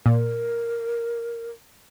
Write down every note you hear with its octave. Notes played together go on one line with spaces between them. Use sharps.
A#2 A#4